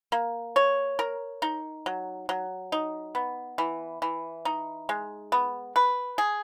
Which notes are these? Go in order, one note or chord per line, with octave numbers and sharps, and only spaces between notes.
A#3
C#5
A#4
D#4
F#3
F#3
D#4
B3
E3
E3
D#4
G#3
B3
B4
G#4